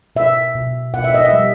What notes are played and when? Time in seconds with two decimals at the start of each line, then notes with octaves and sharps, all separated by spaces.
0.15 B2 E5
0.55 B2
0.94 B2 F#5
1.04 E5
1.15 D#5
1.25 E5
1.33 G3